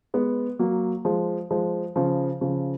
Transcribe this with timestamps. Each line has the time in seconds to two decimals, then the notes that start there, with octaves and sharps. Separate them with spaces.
0.14 G#3 B3
0.59 F#3 A#3
1.05 F3 G#3
1.51 F3 G#3
1.96 C#3 F3
2.41 C#3 F3